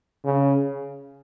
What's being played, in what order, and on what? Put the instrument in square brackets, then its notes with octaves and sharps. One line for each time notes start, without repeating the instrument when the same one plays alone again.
[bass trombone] C#3